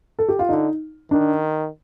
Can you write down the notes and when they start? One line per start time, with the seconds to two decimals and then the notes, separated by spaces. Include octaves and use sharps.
0.19 A4
0.29 G4
0.39 F4
0.49 D3 D#4
1.11 D#3 D4